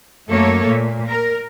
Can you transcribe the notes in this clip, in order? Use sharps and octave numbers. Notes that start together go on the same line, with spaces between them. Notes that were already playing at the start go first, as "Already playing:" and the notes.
F#2 A3 A#3 A4 C#5
A#2
A#4